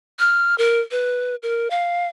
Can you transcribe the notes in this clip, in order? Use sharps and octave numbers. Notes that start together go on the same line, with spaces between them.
F6
A#4
B4
A#4
F5